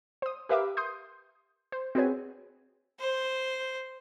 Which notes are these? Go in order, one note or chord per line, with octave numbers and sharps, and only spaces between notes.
C5 D#6
G4 A#4 B4 E5 F5 D6
C6 D#6 G6
C5
C4 F#4 G#4 B4 C#5 G#5
C5